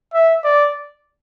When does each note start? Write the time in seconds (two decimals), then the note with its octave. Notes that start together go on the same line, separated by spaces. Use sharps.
0.14 E5
0.44 D5